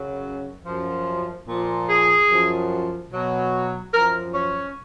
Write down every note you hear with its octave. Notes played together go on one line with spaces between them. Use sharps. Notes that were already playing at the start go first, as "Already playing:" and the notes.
Already playing: F#2 C#3 F#3
F#2 F3
A#2 F3
G#4
F#2 F3
B2 F#3
F#2 F3 A#4
C#4